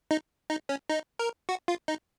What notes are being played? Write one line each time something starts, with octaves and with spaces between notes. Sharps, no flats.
D#4
D#4
C#4
D#4
A#4
F#4
F4
D#4